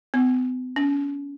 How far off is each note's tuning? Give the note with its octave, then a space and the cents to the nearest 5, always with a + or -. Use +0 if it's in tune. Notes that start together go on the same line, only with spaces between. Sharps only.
B3 +45
C#4 +35